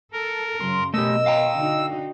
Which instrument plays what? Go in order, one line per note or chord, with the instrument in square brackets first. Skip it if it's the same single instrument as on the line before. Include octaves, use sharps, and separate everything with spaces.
[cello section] A4 [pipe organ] A#4
[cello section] F#2 C#3 [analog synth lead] C6
[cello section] B2 A#4 [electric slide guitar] A3 G4 [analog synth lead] D#5 [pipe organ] E6
[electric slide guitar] F5 G5 A#5
[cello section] D3 D#4 F#4